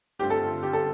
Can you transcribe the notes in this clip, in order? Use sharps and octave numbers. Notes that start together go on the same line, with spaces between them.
G2 D3 A3 C4 F4 G4
A4
G4
A4